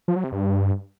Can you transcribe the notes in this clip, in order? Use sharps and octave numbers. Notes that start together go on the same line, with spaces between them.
F3
F#3
C3
G2